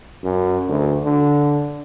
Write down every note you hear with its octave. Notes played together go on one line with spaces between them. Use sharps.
F#2
D2
D3